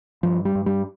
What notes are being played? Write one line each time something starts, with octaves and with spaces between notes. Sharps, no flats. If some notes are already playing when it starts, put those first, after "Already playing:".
G2 F3
G3
G2
G3